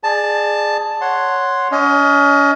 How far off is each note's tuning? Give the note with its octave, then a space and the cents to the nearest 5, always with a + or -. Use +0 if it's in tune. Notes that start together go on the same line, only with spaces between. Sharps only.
G#4 +0 D5 +30 A5 +0
C#5 +0 F#5 +0 C6 +0
C#4 +35 D#5 +20